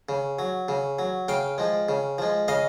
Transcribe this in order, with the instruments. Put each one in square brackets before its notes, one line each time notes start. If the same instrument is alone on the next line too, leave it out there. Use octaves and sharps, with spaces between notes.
[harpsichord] C#3
F#3
C#3
F#3
C#3 F5 G5
F3 G#3
C#3
F3 G#3
C#3 D#5 F5